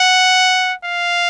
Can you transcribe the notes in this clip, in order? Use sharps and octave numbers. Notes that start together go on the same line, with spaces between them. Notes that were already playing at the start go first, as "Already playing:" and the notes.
Already playing: F#5
F5